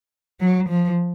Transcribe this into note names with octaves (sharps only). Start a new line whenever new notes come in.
F#3
F3